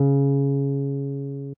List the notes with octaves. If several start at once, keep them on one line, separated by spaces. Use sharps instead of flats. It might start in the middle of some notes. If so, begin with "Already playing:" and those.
Already playing: C#3